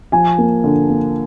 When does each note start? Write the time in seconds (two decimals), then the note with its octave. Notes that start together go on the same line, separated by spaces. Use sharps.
0.12 F3 G#5
0.38 A#3
0.64 D3
0.89 A#3